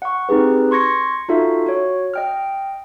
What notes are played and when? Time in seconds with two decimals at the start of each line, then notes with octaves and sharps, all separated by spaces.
0.02 F#5 C#6
0.29 C4 D#4 G4 G#4 B4
0.71 C6 C#6 G#6 A#6 C#7
1.28 D#4 F4 F#4 A4 E5
1.66 F#4 C#5
2.14 D#5 G5 F6